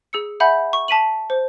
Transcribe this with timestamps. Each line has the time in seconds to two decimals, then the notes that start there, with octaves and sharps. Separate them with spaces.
0.13 G#4 E6 C#7
0.40 E5 F#5 G#5 B5 G6
0.73 C#6
0.88 A5 B6 D#7 F#7
1.30 C5